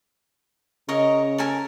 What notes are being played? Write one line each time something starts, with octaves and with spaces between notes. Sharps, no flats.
C#3 A#4 C#5 D#5
A4 A#4 G#5